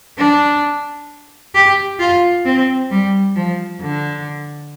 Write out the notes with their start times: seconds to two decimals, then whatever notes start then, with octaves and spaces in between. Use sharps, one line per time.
0.18 D4
1.55 G4
1.99 F4
2.45 C4
2.91 G3
3.36 F3
3.81 D3